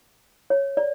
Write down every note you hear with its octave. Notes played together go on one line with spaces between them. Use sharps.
C#5
D5